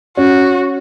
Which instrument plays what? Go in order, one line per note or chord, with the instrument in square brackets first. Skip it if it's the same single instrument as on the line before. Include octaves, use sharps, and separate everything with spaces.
[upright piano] C#4 [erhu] F#4